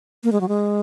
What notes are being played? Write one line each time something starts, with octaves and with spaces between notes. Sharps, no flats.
A#3
G#3
F#3
G#3